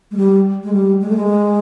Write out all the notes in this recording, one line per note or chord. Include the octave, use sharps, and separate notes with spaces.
G#3
G3
G#3
G3
G#3
A3
G#3